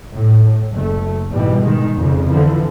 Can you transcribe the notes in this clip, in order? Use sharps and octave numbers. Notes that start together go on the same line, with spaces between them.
A2
F#1 A3
G#2 B2 E3 G3
D#3 G#3
F2 C#3
D3 E3 F3